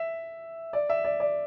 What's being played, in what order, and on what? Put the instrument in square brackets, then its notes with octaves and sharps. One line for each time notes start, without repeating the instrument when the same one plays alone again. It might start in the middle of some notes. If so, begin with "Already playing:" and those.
Already playing: [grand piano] E5
D5
E5
D5
D5